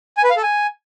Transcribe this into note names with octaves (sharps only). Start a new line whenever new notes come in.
G#5
B4
F5
A4
G#5